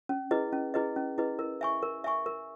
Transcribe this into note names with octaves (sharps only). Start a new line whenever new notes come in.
C#4
E4 G#4 B4 D#5
C#4
E4 G#4 B4 D#5
C#4
E4 G#4 B4 D#5
A#4
E5 G#5 C#6
A#4
E5 G#5 C#6
A#4